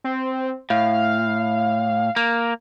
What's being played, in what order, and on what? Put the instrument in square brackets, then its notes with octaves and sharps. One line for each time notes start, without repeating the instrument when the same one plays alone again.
[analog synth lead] C4
[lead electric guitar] A2 [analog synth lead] F5
[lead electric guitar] A#3